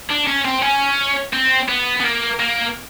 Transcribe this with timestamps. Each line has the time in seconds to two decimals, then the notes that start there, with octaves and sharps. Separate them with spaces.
0.10 D4
0.27 C#4
0.45 C4
0.62 C#4
1.33 C4
1.69 B3
2.01 B3
2.04 A#3
2.40 A#3